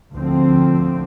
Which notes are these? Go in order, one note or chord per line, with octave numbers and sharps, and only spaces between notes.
D2 D3 F3 C4